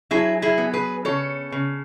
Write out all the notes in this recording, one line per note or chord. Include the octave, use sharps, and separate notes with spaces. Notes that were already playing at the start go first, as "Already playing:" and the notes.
F#3 E4 G#4
E4 G#4
B3
G#4 B4
C#3 A4 C#5
C#3